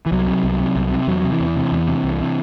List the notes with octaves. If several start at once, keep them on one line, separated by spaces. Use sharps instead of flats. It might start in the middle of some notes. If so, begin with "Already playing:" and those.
E3
C2 F#3
C3
C2
C3
C2
C3
E2 F#3
F#3
C3
E3
E2
C3
E2
C3
C2
C3